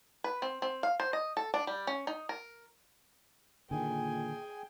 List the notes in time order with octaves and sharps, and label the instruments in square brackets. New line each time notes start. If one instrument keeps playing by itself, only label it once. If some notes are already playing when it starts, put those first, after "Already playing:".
[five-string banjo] B4
C4
C4
F5
C5
D#5
A4
D4
G3
C#4
D#4
A#4
[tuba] A#2 [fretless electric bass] D3 D#3 [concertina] G#4 G#5 [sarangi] G5